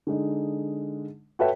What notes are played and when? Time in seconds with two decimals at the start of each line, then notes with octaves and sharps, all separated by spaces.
0.07 D3 G#3 D#4
1.39 F#4 A4 B4 C#5 E5 G5